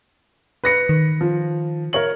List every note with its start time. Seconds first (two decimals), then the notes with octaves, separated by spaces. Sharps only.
0.64 B4 A#6 C#7
0.89 D#3
1.21 F3
1.93 A#4 C#5 F#7